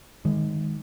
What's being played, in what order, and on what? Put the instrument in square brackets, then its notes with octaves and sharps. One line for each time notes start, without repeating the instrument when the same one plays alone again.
[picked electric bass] D#3 G#3